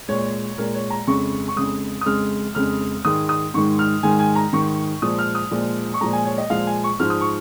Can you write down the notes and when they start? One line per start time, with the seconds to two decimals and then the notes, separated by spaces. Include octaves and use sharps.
0.08 A#2 G#3 C#5
0.58 A#2 G#3 A#4
0.74 C#5
0.90 A#5
1.07 F2 C#3 G#3 C#6
1.48 C#6
1.56 F2 C#3 G#3 D#6
2.01 D#6
2.06 F2 C#3 G#3 F6
2.55 F2 C#3 G#3 F6
3.05 G#2 D#3 G#3 D#6
3.29 D#6
3.54 G#2 D#3 G#3 C#6
3.79 F6
4.03 G#2 D#3 G#3 G#5
4.19 G#5
4.36 A#5
4.53 G#2 D#3 G#3 C#6
5.02 A#2 F3 G#3 D#6
5.18 F6
5.35 D#6
5.51 A#2 F3 G#3
5.94 C#6
6.01 A#2 F3 G#3 A#5
6.13 G#5
6.25 C#5
6.38 D#5
6.50 A#2 F3 G#3 F5
6.67 G#5
6.84 C#6
6.99 G#2 F3 G#3 F6
7.10 D#6
7.21 C#6